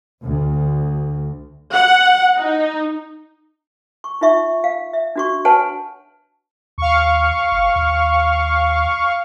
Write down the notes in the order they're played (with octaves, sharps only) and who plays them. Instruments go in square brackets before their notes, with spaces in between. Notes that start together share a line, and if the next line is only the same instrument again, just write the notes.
[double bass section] D2
[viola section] F#5
D#4
[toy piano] C#6
D#4 F4 E5 C#6
F5
E5
D4 F#4 C#6
B4 C#5 F#5 G#5 A5
[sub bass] D#2 [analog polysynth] F5 C#6
[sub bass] G1
D#2